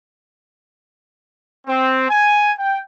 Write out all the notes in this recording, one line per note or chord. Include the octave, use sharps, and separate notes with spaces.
C4
G#5
G5